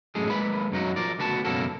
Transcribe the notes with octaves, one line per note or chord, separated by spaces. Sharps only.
F#2 A2 G#3 G#4
G#3 A#3 B4 B5
F#2 F#3 D#4 F#4
F3 A#4 D5
D2 B3 F#4 A5
C#2 F#2 B2 A#3 F#4 A4